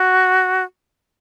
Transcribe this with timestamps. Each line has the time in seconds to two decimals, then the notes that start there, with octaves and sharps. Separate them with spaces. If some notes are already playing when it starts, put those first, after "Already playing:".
Already playing: F#4